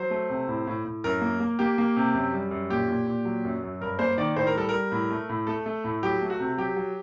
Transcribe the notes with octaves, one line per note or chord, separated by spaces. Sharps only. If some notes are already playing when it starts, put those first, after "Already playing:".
Already playing: F#3 C5
A3
C3
A2
A2
A2
F#2 A#4
A#3
A#3
A#3 G4
A#3
C3
F#2
G3
F#2
A#2 G4
A#2
A#2
F#3
F#2
F#2
G2 A#4
A#3 C5
D#3 D5
A2 C5
A#4
G3 A4
G3 A#4
A2
A3
A2
A3 A4
A3
A2
F#3 G4
A3
F#4
C3
F#3 G4
F#3